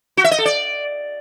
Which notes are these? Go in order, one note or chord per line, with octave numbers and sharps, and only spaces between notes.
F#4
E5
D#5
A4
D5